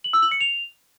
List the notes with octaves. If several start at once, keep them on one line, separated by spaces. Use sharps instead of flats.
F#7
E6
F#7
C#7
F7